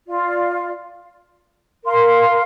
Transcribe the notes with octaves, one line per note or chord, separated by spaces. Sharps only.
F4 D5 F5
A#4 F5 C6